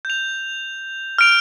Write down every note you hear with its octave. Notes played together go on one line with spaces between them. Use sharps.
G6 F7
F6 D7 F7